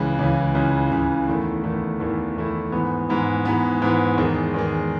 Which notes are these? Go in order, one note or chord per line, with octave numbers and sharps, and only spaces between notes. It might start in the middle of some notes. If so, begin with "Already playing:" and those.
Already playing: C#2 C#3 E3
C#2 C#3 E3
C#2 C#3 E3
C#2 C#3 E3
E2 D#3 A3 E4
E2 D#3 A3 E4
E2 D#3 A3 E4
E2 D#3 A3 E4
G#2 E3 B3
G#2 E3 B3
G#2 E3 B3
G#2 E3 B3
E2 D#3 G#3
E2 D#3 G#3